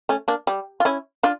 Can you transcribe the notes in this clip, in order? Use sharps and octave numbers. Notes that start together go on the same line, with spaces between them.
A3 C#4
A#3 D4
G3
F4
C#4 E4
D4 F4